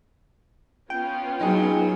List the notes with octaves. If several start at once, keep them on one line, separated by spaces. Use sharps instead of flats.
B3 C#4 F4 G5
F#3 D#4 G#4